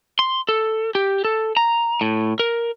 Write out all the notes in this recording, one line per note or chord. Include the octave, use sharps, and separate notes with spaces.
C6
A4
G4
A4
A#5
A2
A#4